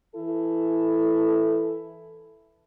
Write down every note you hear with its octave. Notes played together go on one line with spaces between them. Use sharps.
E3 E4 A4